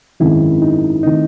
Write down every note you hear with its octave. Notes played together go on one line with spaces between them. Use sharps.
G#1 F#2 D#3 G#3 C4 E4
D#4
D#3 A3 C4 D#4 E4